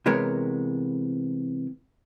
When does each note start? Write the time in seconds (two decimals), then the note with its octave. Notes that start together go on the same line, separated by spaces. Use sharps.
0.06 C3 E3 G#3 B3 A#4 C#5